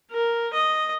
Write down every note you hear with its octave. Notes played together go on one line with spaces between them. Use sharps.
A#4
D#5